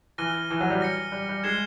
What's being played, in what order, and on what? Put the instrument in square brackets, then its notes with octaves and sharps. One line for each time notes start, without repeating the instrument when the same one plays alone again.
[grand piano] E3 [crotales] F6 A#6 D#7 G7
[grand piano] E3
F#3
G3
[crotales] F6 A#6 C#7
[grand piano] G3
G3
[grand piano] G#3 [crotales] G#6 C7 E7 G7